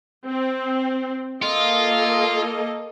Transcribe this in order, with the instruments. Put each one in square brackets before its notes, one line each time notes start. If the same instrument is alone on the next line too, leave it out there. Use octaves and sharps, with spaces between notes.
[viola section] C4
[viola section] A#3 A4 D#5 [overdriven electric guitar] F4